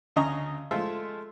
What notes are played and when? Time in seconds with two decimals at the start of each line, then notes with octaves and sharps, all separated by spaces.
0.16 D2 C#3 C#4 D#5 A#5 C#6
0.71 G#3 A3 F4 A4 C5 E5